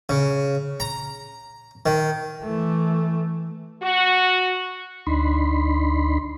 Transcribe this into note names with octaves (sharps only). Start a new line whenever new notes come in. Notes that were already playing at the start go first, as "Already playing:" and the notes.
C#3
A#5
D#3
E3 A3
F#4
D2 D4 D#4 B5 C6